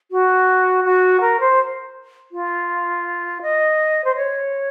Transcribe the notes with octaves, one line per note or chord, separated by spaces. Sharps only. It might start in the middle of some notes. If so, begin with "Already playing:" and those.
F#4
F#4
A#4
C5
F4
D#5
C5
C#5